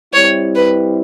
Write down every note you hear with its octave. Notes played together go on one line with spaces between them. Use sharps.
G3 C4 E4 C#5
B4